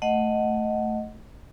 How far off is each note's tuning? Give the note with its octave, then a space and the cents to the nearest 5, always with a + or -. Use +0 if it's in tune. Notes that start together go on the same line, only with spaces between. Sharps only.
A3 +0 D#5 +0 F#5 +0